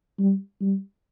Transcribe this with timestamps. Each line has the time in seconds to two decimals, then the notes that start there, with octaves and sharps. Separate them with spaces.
0.19 G3
0.61 G3